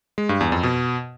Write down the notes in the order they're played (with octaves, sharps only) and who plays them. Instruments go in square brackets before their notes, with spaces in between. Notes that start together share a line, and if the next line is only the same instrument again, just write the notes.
[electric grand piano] G#3
G2
E2
F2
B2